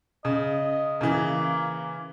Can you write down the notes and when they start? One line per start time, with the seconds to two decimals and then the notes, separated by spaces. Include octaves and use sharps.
0.25 C#3 D#5
1.01 C#3 E3 A#3